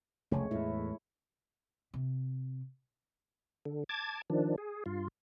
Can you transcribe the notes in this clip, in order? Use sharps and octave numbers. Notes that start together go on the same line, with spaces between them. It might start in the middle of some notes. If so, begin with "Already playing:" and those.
F1 C#2 G#3 A3 C#5
E2 A2 E4
C3
D3
A5 D6 G#6
D#3 F3 D4
G#4
G2 F4